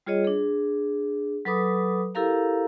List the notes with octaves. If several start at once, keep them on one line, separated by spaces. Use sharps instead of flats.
G3 F4 G#4 C#5 D#5
D4 G#4
F#3 A4 B4 B5 D6 D#6
E4 G4 A4 A#4 F5 A#5